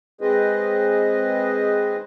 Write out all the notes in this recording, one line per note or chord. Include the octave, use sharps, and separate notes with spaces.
G#3 C4 G#4 B4 C5 D#5